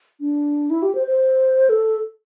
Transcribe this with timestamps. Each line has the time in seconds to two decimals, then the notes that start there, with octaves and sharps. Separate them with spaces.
0.20 D4
0.70 E4
0.82 G4
0.95 C5
1.07 C5
1.69 A4